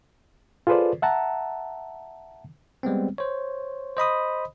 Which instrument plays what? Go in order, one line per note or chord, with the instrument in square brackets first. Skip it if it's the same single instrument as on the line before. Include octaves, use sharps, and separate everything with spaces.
[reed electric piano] F4 G#4 A4 B4 C5 D5
E5 F#5 A5 A#5
[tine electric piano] G3 G#3 B3 C4
C5 C#5
C5 D#5 B5 D#6